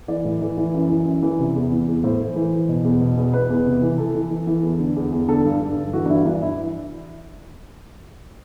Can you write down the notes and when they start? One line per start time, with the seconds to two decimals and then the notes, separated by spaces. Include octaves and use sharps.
0.08 E3 D5
0.25 A2
0.41 E3
0.57 E3
0.74 F#2
0.89 E3
1.05 F#2
1.22 E3
1.39 C3
1.55 E2
1.71 E3
1.88 E2
2.03 A2 C5
2.20 E3
2.36 E3
2.52 E3
2.69 B2
2.85 E2
3.01 B2
3.17 E2
3.33 E2 B4
3.50 E2
3.66 C3
3.82 E3
3.98 E3 A4
4.15 E3
4.31 E3
4.47 E3
4.63 E2
4.79 D3
4.96 E2
5.12 E2
5.28 D3 A4
5.45 G2
5.61 G2
5.77 D3
5.93 E3 F#4
6.06 D4
6.09 G2 E4
6.26 E3 D4
6.42 E3 E4